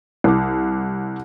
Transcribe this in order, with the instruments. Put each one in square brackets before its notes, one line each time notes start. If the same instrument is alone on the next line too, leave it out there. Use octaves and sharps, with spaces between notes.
[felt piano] C2 D6